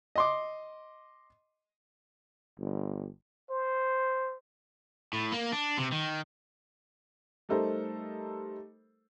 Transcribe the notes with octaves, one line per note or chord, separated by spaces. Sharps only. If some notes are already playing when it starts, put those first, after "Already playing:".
D#5 C6 D6
G1
C5
A2
A#3
D4
C3
D#3
G3 A3 D#4 A4 A#4 C5